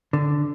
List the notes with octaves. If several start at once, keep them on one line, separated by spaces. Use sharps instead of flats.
D3